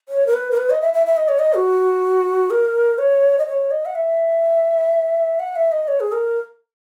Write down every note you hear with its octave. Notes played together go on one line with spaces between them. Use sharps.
C#5
A#4
B4
A#4
B4
D#5
E5
E5
E5
D#5
C#5
D#5
F#4
A#4
C#5
D#5
C#5
D#5
F#5
E5
F#5
E5
D#5
C#5
G#4
A#4